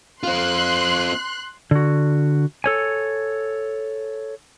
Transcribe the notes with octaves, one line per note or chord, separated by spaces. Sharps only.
C4 F4 C6 F#6
D3 F#4
A4 C#5 G#5